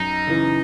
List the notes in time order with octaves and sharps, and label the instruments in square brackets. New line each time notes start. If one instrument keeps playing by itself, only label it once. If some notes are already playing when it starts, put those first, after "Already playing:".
Already playing: [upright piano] F#2 [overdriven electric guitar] D#4
[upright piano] C#3 E3